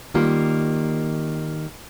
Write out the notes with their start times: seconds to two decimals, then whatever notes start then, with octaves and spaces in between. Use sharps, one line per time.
0.14 D#3 G3 A#3 F4